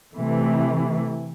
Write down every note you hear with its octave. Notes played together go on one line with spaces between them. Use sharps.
C3 E3 A3